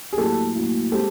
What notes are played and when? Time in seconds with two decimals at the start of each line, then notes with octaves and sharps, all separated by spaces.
0.13 G#4
0.17 A2 F#3 A#3 G4 A4
0.55 A2 F#3 A#3
0.92 G#3 C4 G4 A4